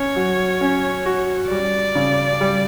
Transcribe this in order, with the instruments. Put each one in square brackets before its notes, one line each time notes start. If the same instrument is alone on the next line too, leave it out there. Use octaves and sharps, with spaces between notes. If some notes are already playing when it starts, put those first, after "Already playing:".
Already playing: [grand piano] C#4 [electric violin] C#5
[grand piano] F#3
C#4
F#4
[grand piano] G3 [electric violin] D5
[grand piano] C#3
G3